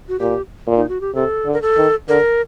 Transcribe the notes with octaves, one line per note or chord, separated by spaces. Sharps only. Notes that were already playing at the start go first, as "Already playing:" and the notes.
F#4
A#2 G4
A#2
D#4
F#4
G4
C3 A4
D3
A#4
A4
D#3
D3 A#4